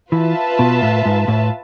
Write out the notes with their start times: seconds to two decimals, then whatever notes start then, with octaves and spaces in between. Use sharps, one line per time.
0.12 E3 F4 B4 E5 A5
0.59 B2
0.82 A2
1.06 G#2
1.28 A2